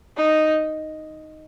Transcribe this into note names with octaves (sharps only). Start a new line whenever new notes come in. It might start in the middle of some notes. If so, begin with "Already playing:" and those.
D#4